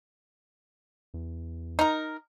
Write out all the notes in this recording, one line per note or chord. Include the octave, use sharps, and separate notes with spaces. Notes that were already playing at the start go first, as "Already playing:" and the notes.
E2
D#4 A#4